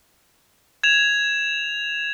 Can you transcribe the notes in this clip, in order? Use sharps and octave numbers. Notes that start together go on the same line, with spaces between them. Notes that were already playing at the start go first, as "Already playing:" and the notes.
G#6 E7 F7